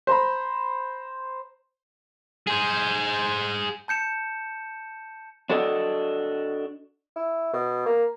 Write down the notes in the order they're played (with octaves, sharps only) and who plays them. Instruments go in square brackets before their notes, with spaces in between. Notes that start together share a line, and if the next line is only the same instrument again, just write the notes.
[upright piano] C5 A#5 B5
[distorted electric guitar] G#4 C5
[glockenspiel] A5 G6 C#7 E7
[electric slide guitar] D4 F#4 A4 D5 D#5
[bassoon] E4
B2
A#3